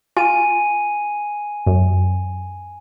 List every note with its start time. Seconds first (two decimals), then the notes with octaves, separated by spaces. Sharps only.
0.17 F4 G#5 D#7
1.67 F#2